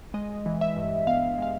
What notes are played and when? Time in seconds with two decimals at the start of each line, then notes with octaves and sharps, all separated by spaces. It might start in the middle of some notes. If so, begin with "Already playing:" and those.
0.14 G#3 D#5
0.46 E3
0.61 E5
0.77 G2
1.07 B3 F5
1.38 G#3 F5